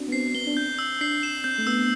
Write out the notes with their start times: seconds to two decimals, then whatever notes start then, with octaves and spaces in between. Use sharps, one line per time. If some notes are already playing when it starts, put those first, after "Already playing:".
Already playing: C4 D4 F#4
0.08 B3
0.12 C4 C7
0.35 B3 G7
0.47 D4
0.56 C4 G6
0.79 E6
1.01 D4 C7
1.23 E7
1.44 C4 G6
1.58 A3
1.67 B3 E6